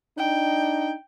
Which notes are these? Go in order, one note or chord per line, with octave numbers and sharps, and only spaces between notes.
D4 D#4 G5